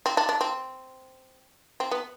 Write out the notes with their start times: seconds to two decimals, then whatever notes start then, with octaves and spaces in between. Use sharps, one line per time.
0.06 C4
0.17 D4
0.29 D4
0.41 C4
1.80 C4
1.91 B3